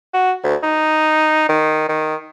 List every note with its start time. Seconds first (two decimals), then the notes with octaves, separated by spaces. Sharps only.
0.13 F#4
0.43 D2
0.63 D#4
1.49 D#3
1.89 D#3